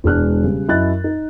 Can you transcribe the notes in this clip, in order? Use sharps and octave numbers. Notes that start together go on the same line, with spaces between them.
E1 G#3 D4 F6 F#6
C#3 G3
F#2 E4 D#5 F#6 A6
D#4